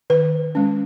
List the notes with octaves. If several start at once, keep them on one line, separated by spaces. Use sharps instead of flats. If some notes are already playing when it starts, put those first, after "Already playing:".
D#3 B4
G#3 C#4